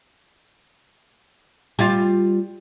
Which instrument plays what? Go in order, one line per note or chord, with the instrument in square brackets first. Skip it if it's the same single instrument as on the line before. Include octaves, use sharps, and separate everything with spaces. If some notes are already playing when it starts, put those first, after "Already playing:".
[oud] G3 F4